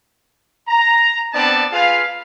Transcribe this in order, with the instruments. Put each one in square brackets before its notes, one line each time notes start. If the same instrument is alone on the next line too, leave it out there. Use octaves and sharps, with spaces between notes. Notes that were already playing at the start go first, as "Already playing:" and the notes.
[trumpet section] A#5
B3 C4 D4 D5 A5
F4 G#4 B4 F5